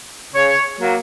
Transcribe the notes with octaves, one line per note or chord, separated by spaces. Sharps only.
C#3 C#5
F#3 A#3